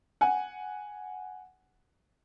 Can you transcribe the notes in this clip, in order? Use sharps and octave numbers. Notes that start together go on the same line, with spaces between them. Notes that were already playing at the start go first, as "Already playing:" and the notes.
F#5 G#5